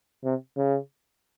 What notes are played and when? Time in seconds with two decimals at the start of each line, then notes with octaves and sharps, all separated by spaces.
0.24 C3
0.57 C#3